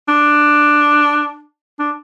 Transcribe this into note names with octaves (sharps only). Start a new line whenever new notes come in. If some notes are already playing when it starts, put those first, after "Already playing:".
D4
D4